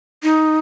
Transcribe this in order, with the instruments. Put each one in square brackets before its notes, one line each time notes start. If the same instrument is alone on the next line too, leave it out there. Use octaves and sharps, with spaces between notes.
[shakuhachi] D#4